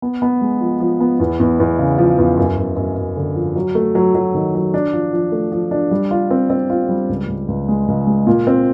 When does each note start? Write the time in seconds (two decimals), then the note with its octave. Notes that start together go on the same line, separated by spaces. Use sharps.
0.02 B3
0.22 B3
0.41 G#3
0.61 F3
0.80 F3
1.00 B3
1.20 E2
1.40 E2
1.60 E2
1.79 C#3
1.98 F3
2.18 E2
2.37 F#2
2.57 F#2
2.76 F#2
2.97 F#2
3.17 D3
3.35 F3
3.55 F#3
3.75 A3
3.95 F#3
4.15 F#3
4.34 D#3
4.54 F#3
4.74 D4
4.93 F3
5.13 F3
5.32 A3
5.52 F3
5.71 D4
5.91 G3
6.11 F4
6.31 C4
6.50 C4
6.70 F4
6.89 G3
7.09 C#2
7.28 C#2
7.48 C#2
7.69 G#3
7.88 C#2
8.07 G#3
8.27 A#2
8.47 C4